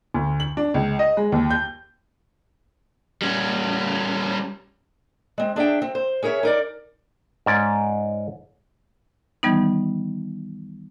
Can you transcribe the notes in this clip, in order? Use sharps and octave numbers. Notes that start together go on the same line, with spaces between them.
D2
F#7
D4
C#2
D#5
G#3
D#2
G6
G3 C#4
G#3 C4
D4 G#4 E5 G5
C4
C5
C#4 G#4 A#4 C#5 E5
D#4 A#4 D5
G#2 C#4 D5
D#3 E3 G3 B3 D#4